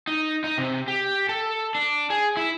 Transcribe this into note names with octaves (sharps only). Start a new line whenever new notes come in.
D#4
D#4
C3
G4
A4
D4
G#4
E4